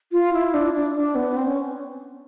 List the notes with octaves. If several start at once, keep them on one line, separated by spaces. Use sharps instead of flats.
F4
E4
D4
D4
D4
B3
C4
C#4